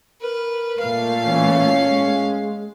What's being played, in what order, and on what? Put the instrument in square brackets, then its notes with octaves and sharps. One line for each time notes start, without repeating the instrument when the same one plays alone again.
[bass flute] A#4 [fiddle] B4
[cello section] A#2 A3 [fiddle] F5
[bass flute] E3 [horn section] C#4
[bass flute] G#3